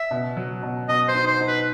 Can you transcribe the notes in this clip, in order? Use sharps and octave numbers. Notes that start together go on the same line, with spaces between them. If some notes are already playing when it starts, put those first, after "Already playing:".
Already playing: E5
B2
F#3
B2
B2 D#5
C5
D#4
C5
D#4
B4